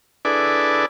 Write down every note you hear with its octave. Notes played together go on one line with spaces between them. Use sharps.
D4 E4 G#4 A4 B4 D5